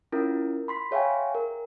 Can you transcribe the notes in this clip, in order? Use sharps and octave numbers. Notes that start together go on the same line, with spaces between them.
C#4 E4 F4 A#4
B5 C6 B6
G#4 C#5 E5 F5 G5 G#5
A#4